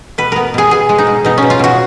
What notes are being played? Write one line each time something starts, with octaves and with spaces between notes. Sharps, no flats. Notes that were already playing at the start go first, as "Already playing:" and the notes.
B2 B4
B3 A#4
B2 G#4
B2 G#4
G#3
D#4
B2
B2 D#4
B2 C#4
F4
B2 F#4